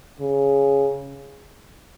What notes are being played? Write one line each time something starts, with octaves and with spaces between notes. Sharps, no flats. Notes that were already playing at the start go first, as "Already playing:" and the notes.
C#3